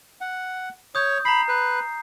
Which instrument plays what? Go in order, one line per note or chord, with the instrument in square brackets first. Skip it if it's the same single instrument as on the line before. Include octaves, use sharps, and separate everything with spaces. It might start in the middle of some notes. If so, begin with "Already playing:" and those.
[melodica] F#5
[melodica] C#5 [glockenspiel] D#6 G6
[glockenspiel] A#5 C7 [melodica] B5
[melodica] B4